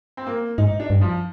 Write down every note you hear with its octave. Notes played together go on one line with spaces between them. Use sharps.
C4
A#3
G#2 D#4
D4
G2
F3